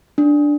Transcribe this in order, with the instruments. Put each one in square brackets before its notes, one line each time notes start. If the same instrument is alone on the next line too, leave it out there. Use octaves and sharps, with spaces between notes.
[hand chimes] D4